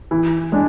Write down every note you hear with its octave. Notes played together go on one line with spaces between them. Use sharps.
E3
G#3 D4